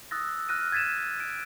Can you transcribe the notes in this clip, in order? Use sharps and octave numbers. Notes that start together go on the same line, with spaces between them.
D#6 E6 F#6 A6 A#6
F6 F#6 A#6 D#7
G#6 A6 B6 D#7 E7
D7